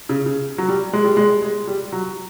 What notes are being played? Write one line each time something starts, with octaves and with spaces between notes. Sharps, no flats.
C#3
C#3
F#3
G3
G#3
G3
G#3
G#3
G3
F#3